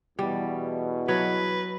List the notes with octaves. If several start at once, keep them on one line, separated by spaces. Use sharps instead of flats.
E2 B2 G3
F#3 B4